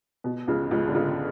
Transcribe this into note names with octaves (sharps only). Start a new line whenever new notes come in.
B2
C#2 C#3
C#2 C#3
D3
C#2 C#3